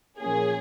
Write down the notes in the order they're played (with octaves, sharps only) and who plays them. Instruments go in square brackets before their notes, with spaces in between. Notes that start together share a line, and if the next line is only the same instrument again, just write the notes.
[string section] A#2 F3 A#3 C#4 G#4